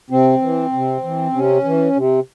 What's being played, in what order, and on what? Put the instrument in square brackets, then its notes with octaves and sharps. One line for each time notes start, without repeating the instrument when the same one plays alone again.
[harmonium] C3 C4
E3
C3
E3
C3 C#4
E3
C3